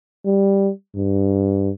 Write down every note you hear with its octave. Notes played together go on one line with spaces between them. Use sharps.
G3
G2